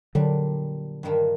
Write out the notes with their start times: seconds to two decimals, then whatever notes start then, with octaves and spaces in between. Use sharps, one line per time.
0.15 A#2 D3 F#3 G3 D4
1.03 G2 D#3 G3 A#3